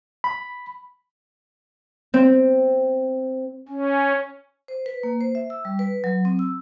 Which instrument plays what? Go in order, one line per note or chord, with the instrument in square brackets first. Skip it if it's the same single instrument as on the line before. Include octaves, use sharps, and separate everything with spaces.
[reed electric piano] B5
[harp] C4
[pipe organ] C#4
[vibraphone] C5
B4
A#3
C5
E5
E6
G3
B4
F#3
C4
E6